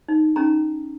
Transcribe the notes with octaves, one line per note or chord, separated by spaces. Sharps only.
D#4
C#4 D#4 A#5